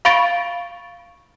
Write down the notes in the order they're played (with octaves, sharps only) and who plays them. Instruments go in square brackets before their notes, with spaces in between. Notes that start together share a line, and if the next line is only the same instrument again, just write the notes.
[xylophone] F5 B5 C#6 A6 D7